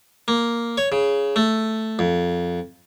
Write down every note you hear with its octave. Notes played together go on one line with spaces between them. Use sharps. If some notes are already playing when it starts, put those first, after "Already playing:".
A#3
C#5
C#3
A3
F2